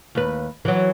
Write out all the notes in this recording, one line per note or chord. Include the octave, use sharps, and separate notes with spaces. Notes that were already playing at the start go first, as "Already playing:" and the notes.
D#2 B4
E3 F#3